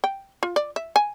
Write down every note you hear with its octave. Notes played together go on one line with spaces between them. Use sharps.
G5
F4
D5
E5
G#5